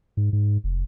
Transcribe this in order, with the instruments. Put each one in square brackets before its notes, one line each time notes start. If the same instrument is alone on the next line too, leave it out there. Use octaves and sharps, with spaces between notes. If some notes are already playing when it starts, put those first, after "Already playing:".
[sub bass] G#2
G#2
F1